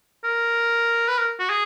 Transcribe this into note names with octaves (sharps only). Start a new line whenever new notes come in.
A#4
B4
A#4
F#4
G#4